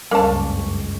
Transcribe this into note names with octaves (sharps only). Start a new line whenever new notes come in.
F#1 C#2 G2 G3 A#3 C#4 A5 C#6